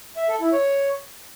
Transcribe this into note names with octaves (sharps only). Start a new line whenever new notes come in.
E5
A4
E4
C#5